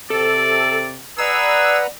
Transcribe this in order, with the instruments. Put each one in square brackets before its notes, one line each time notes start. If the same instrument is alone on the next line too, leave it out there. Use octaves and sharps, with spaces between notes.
[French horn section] C3 [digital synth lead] A4 [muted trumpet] D5
[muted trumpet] G#4 [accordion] B4 F#5 A#5 [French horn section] D5 [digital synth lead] E6